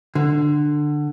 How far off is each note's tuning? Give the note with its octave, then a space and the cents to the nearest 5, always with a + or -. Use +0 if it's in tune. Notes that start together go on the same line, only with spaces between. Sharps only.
D3 +15